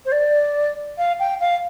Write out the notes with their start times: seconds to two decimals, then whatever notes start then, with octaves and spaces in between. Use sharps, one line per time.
0.05 C5
0.12 D5
0.98 F5
1.19 G5
1.40 F5